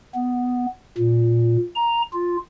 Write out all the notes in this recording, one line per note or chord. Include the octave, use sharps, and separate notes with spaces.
B3
A#2
A#5
F4